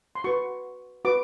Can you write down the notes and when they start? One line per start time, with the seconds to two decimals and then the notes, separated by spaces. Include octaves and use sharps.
0.15 C6
0.24 F#4 B4 C#6
1.05 F#4 B4 D6